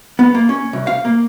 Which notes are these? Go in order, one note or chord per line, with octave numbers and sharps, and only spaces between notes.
B3
A#3
C#4
C2
F5
A#3